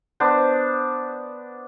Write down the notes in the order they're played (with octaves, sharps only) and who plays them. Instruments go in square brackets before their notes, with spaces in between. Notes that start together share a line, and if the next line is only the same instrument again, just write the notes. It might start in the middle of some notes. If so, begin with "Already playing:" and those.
[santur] B3 D4 C5